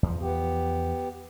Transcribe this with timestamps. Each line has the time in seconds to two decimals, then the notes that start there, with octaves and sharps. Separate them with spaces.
0.03 E2 F3
0.22 B3 G4